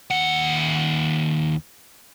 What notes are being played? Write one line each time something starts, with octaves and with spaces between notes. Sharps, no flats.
D#2 F#5